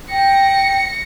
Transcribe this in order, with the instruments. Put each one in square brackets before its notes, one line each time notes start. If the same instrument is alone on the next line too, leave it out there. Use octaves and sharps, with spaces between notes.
[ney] G5 [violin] A#6 C#7